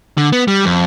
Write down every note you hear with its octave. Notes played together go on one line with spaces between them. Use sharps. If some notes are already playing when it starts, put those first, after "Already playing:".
D3
B3
G3
F2